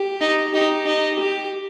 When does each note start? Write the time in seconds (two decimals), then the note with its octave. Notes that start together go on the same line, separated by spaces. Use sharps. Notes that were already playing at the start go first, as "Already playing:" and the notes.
Already playing: G4
0.21 D#4
0.54 D#4 G4
0.86 D#4
1.18 G4